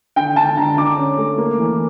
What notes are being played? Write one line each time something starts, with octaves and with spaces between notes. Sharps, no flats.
D3 G5
D3 A5
D3 A#5
D3 D6
C#4
A3
A#3
E3